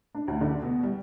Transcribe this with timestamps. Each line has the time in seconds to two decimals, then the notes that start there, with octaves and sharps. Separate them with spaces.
0.15 D4
0.28 D2
0.41 D3
0.62 B2
0.83 G3